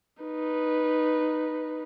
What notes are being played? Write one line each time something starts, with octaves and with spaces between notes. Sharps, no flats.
D#4 B4